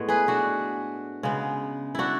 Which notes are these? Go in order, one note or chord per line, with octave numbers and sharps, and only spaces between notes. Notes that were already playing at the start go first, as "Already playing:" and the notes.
Already playing: A2 G#3 B3 C#5
G#4 B4
D4 F#4
C#3 G#3 B3
D4 E4 F#4